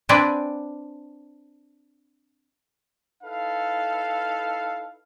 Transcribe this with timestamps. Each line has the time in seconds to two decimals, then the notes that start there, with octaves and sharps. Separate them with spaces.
0.09 C4 D4 B4 D5 G5 G#5
3.23 D#4 E4 A4 B4 F5